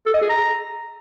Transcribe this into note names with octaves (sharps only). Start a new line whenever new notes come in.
A4
D#5
G#4
A#5